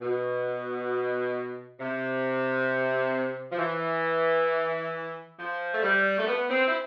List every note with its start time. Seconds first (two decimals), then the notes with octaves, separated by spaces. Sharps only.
0.01 B2
1.80 C3
3.51 F3
3.58 E3
5.38 F3
5.73 A3
5.82 G3
6.18 A3
6.27 B3
6.49 C4
6.67 E4